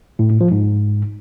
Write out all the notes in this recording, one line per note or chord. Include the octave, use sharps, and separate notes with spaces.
A2
A2
F3
G#2